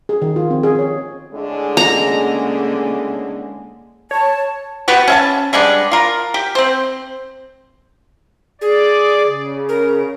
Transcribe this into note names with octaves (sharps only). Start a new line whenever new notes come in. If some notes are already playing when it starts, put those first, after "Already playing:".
G#4
D#3
F4
C4
G#4
C#5
A2 D3 G#3
C#3 A#3 A#5
C#5 A5
B3 F#4 G4 B4
C#4 E5 A5
G3 G#3 B3 D4
F4 A#4
G4
C4 C5
G#4 D5
C#3
A#4